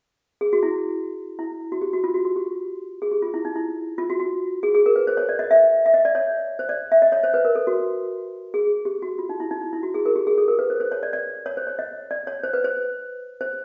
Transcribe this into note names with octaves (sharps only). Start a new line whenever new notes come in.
G#4
F#4
E4
E4
F#4
G4
F#4
F4
F#4
F#4
G4
G#4
G4
F4
E4
D#4
E4
F4
F#4
F#4
G#4
G#4
A#4
B4
C5
C#5
D5
D#5
E5
E5
D#5
D5
C#5
C5
D5
E5
D#5
C#5
C5
B4
A#4
A4
F#4
G#4
G4
F#4
F4
D#4
E4
D#4
D#4
E4
F#4
G#4
A#4
G4
G#4
A4
A#4
B4
C5
C5
C#5
D5
D5
C#5
C5
C#5
D#5
D5
C#5
C5
B4
C5
C5